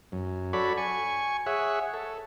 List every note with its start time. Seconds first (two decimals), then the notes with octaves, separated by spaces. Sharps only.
0.12 F#2
0.53 F#4 A4 C#5 D5 B5
0.77 G#5 C#6
1.46 G#4 C#5 E5 F#5
1.94 A4